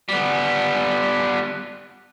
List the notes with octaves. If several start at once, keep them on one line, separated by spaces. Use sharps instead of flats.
G3 B3